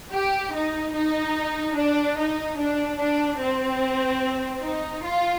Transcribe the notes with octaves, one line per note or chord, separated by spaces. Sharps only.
G4
D#4
D#4
D4
D#4
D4
D4
C4
D#4
F4